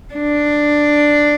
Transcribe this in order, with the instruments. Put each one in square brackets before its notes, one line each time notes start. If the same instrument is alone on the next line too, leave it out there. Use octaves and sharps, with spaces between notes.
[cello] D4